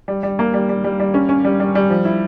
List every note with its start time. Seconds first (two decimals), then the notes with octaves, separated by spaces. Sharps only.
0.08 G3
0.23 G3
0.39 A#3
0.54 G3
0.69 G3
0.84 G3
1.00 G3
1.14 C#4
1.29 C#4
1.45 G3
1.60 G3
1.75 G3
1.90 F3
2.05 E4